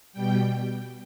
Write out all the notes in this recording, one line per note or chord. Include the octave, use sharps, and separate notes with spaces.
B2 G3 G5